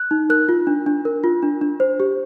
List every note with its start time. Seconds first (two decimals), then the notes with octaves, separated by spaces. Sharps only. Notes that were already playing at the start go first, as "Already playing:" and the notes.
Already playing: F#6
0.11 D#4
0.30 A#4 F#6
0.49 F4
0.67 D4
0.86 D4
1.05 A#4
1.24 F4
1.42 D4
1.61 D4
1.80 C5
2.00 G4